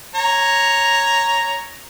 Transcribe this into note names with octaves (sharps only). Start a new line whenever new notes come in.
C#5 A#5